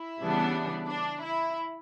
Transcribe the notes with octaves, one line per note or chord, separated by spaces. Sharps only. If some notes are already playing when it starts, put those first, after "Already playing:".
Already playing: E4
C#3 E3 G3 B3 D4
D4
E4